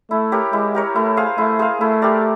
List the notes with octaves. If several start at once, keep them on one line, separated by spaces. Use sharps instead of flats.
A3 E4
G4 A#4 C#5
G#3 E4
G4 A#4 C#5
A3 E4
G#4 C5 F5
A3 E4
G#4 C5 F5
A3 E4
G4 A#4 D5